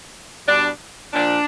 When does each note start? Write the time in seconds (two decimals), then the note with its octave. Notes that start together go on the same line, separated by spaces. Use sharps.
0.47 B2 G3 D4
1.14 A#2 F3 D4